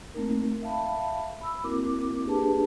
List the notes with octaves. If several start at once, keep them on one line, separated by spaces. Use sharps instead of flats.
A3 A#3 C4 D#4 A#4
E5 F5 A5 B5
B5 E6
A#3 C4 E4 F#4 A#4 D6
A#3 D4 G4 G#4 B4 A5